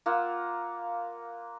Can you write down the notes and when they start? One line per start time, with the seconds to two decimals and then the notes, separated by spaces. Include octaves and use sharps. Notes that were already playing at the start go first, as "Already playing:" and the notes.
0.06 A#3 F4 F#5 E6